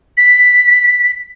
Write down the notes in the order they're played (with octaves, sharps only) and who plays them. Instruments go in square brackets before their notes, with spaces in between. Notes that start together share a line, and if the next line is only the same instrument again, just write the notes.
[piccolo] B6